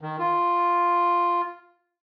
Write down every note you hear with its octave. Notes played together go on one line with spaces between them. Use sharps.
D#3
F4